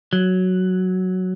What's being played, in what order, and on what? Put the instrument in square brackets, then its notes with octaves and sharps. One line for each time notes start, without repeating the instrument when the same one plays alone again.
[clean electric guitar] F#3